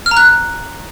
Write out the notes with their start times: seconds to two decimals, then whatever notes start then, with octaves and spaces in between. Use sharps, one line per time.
0.06 F6
0.11 A#5
0.17 F#6